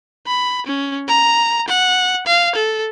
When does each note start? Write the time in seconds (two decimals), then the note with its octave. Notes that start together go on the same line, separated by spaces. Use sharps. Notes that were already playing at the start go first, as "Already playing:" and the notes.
0.27 B5
0.67 C#4
1.08 A#5
1.68 F#5
2.27 F5
2.56 A4